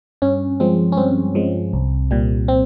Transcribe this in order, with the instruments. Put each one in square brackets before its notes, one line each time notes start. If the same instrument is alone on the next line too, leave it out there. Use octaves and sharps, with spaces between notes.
[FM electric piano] G2 C#4
F3 G#3 C4
C#4
G2 C4
F3 G#3
C2
A#2 G3
C4